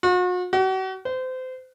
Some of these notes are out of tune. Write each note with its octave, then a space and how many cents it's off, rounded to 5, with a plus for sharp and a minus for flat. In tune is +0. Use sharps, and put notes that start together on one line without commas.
F#4 -40
F#4 +40
C5 -30